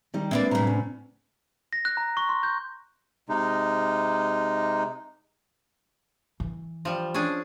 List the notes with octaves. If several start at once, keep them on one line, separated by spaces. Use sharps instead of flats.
D#3 G3 D#4
G#3 A#3 C4 D4 B4 D5 E5
F#2 A2 C3 G3 A#5
C#4
A#6
F#6
A#5
C#6
C6
G6
C3 G#3 D#4
E3
F3 G3
C#4 D4 G#4